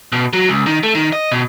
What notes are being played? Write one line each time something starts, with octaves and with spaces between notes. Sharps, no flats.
B2
F#3
C#2
D#3
A3
D#3
D#5
B2